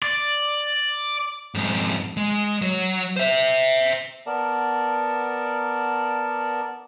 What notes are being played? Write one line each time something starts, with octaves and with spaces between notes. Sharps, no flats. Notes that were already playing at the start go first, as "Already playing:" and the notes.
D5
F2 G#2
G#3
F#3
C5 E5
B3 A#4 D5 A5